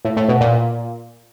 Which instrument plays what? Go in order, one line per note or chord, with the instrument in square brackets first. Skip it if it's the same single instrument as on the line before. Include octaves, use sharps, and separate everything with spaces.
[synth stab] A2
A2
B2
A#2